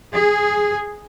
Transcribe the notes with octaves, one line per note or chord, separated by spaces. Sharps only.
G#4